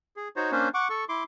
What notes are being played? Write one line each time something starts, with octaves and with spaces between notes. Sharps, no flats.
G#4
D#4 F#4 C5 C#5
A#3 C#4 D4 C5
F#5 C#6 D6
A4 C#6
E4 C6 D6